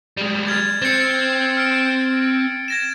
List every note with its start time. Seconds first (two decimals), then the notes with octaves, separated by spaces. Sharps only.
0.17 G3 G#3
0.47 F6 G#6 A6
0.82 C4 A6 C#7
1.57 F6 C7 D7
2.68 G#6 A#6 E7